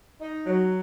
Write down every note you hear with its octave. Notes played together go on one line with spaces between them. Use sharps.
D#4
F#3